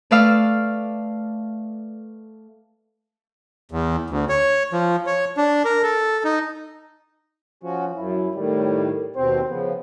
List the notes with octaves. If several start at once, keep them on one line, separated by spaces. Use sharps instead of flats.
A3 B4 D5 F5 E6 F6
E2
D2
C#5
F3
C#5
D4
A#4
A4
D#4
F3 C#4 F#4
F#2 E4
A2 D#3 G3
D#2 B2 C4 C5
C#3 F3 B3